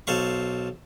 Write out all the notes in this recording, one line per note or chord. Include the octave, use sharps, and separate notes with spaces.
B1 A4 C5 F5 C#6